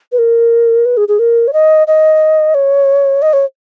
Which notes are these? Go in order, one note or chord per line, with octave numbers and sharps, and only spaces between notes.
B4
A#4
B4
G#4
G#4
A#4
C#5
D#5
D#5
C#5
D#5
C#5